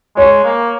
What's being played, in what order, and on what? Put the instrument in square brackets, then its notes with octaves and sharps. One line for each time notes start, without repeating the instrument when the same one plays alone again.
[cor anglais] G#3 [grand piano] C#5
[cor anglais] A#3